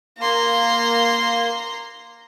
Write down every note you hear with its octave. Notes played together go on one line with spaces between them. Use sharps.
A#3 A#5 C6